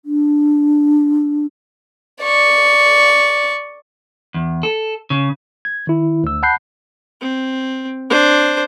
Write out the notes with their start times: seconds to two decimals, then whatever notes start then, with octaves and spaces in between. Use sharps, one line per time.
0.05 D4
2.23 D5 C#6
4.34 E2
4.63 A4
5.10 C#3
5.65 G#6
5.87 D#3 E4
6.24 D2 E6
6.43 F#5 A5 B5 F#6 G6 C7
7.21 C4
8.10 D4 C5